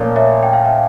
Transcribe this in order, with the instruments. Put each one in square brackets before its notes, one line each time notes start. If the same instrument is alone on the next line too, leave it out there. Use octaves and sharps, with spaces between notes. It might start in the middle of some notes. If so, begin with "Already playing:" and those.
Already playing: [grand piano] A#2 F3 A3 C#4 [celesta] A#4 D5
[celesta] C#5 E5
G5
F5
E5